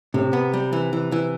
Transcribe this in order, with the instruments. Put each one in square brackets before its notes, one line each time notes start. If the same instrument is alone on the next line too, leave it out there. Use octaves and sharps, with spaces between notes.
[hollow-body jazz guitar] A2 [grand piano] C3
[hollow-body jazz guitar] B3
G3
E3
E3
E3